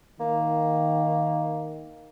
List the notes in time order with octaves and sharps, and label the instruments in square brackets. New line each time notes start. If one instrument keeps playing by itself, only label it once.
[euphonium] D#3 [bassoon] A#3